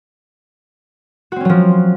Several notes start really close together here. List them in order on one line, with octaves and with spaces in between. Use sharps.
F#4 C4 C#4 F#3 F3